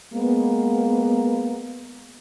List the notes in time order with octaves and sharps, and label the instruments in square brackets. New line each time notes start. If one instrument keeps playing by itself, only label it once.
[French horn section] G#3 A#3 B3